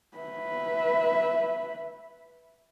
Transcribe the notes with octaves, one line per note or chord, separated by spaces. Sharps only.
B4 E5